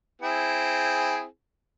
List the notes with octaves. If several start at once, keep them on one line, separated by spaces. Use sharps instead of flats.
C4 E4 G#4